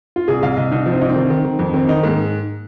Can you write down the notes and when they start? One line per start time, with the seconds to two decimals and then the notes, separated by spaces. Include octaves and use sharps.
0.16 F4
0.28 C2 G#4
0.42 C2 F5
0.57 C2 D#5
0.71 C2 D#4
0.86 F3
0.93 C4
1.01 C2 D#4
1.09 C4
1.16 D#3
1.30 D#3
1.44 D#3
1.59 F2
1.73 D#3 C4
1.89 D#3 D#4
2.03 G#2 A#3